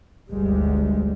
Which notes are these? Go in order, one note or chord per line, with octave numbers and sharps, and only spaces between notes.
G1 D2 G3 G#3